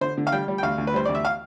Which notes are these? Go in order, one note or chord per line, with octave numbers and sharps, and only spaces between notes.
D3 C5
D3
F5
G3 G5
G3
G5
D2 F5
D2
B4
G3 C5
D2 D5
E5
F5